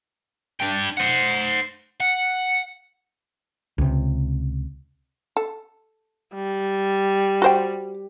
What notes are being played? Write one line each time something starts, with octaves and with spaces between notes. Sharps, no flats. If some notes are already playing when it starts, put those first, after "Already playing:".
D4 G5
C5 F#5
F#5
C#2 C3
A4
G3
F#4 C5 G5